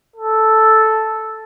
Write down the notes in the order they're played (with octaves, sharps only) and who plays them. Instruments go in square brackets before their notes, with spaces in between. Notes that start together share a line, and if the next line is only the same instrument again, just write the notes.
[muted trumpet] A4